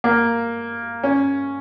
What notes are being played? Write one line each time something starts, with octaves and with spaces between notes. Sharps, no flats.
A#3
C#4